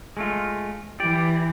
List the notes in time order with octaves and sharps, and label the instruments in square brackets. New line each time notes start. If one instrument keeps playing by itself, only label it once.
[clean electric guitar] G#3 A3 F4
[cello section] E3 [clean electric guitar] G4 D5